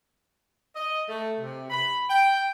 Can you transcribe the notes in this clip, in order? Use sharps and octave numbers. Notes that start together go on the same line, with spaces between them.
D#5
A3
C3
B5
G5